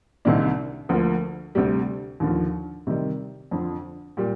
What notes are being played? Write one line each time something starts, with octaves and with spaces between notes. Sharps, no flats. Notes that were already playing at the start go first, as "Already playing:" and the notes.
C2 C3 D#3 A#3 D4
D2 D3 F3 A#3
D2 C3 G3
D#2 D3 F3
C3 D#3 G3
F2 D3 F3
A#2 G3